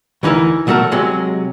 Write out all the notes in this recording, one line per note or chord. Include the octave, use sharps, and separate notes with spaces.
D2 E3 D#4 E4 A#4
B1 F#3 A3 F#4 A#4 A5
C3 F#3 G#3